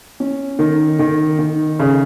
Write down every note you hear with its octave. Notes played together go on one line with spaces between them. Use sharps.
C#4
D#3
D#3
D#3
C#3